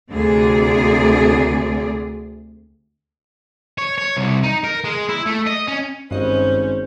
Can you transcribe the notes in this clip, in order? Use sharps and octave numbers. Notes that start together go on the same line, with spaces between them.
D2 C3 G#4 D5
C#5
C#5
C2
D#4
A#4
G#3
E4
A3
D#5
C#4
G#1 G2 C#4 C5 D#5